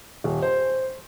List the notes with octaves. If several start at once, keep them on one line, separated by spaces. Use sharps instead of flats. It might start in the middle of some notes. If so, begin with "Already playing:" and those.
D#1
C5